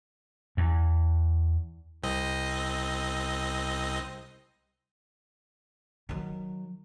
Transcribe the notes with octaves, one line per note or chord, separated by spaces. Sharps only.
E2
C2 C4 D#5
D#3 F#3